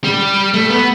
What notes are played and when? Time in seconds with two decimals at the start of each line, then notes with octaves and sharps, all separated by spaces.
0.04 G3
0.54 A3
0.70 B3